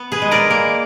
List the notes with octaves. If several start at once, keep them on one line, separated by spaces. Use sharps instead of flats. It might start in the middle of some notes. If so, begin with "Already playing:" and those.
Already playing: B3
G#4 B4
G#3
A#4 D5
A#3